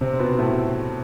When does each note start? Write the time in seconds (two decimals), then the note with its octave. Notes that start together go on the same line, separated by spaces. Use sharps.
0.01 C3 C4
0.13 C4
0.19 B2 B3
0.38 A2 A3